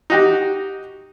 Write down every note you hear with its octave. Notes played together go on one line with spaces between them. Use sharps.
D#4 F#4 G4